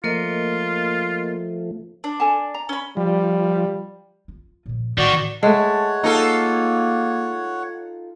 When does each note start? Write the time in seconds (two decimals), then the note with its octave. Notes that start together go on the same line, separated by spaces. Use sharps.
0.04 F3 A3 A#3 F4 A#4 D#5
2.04 D4
2.20 A4 G#5 A5
2.54 A#5
2.69 C#4 B5
2.97 F3 G3
4.28 F4
4.66 A#2 F3
4.98 A2 D#3 A#3 F#4 D5
5.43 G#3 A3 C#5 F#5 A5
6.03 A#3 D#4 F4 A4